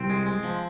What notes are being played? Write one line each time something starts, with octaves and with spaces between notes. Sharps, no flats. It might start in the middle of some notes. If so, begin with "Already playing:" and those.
Already playing: C2 C4
G#3
G#3
F3